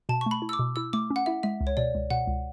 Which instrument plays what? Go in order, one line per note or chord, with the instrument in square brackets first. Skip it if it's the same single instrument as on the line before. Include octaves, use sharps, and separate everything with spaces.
[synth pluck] B2 [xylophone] A5
[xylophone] C#6
[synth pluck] A3 [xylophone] B5
[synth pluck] E4
[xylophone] E6
D6
[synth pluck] B2
[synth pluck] E4 [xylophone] E6
[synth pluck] A3 [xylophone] D6
[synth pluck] C#4
[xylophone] F#5
[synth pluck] E4 [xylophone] E5
[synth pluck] G#3 [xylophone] E5
[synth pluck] C#2
[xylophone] C#5
[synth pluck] B2 [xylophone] D5
[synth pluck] C#2
[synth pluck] B2 [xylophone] F#5
[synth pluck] C#2